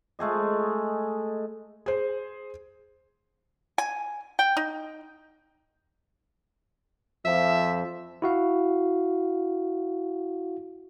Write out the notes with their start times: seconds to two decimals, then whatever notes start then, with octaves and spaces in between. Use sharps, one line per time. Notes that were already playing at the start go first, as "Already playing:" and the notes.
0.19 G#3 A3 G#4 D#5
1.86 G#4 C5
3.78 G#5
4.39 G5
4.57 D#4
7.25 F2 F3 E5
8.22 E4 F#4 F5